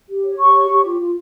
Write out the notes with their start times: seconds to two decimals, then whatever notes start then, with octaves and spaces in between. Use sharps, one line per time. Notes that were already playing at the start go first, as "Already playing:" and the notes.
0.10 G4
0.25 C#5
0.40 G4 C#6
0.55 C#5
0.70 G4
0.85 F4
1.00 F4